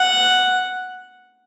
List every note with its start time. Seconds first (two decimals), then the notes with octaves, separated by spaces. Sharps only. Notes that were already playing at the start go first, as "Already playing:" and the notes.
Already playing: F#5